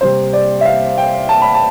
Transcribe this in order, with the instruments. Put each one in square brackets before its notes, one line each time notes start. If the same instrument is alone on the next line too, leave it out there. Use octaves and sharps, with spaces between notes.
[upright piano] C3 G3 C4 C5
D5
E5
F5
G5
A5
B5
A5